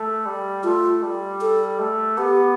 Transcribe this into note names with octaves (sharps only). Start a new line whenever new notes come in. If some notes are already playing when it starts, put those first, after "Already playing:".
Already playing: A3
G3
A3 F4
G3
A4
A3
B3 G4